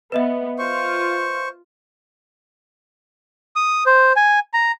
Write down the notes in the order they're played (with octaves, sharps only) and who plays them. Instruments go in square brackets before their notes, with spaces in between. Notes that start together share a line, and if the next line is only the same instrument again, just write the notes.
[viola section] B3 [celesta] B4 D#5 E5
[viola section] F4 [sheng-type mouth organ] C5 C#6
[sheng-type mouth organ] D#6
C5
G#5
A#5